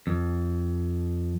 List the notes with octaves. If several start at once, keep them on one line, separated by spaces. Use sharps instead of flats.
F2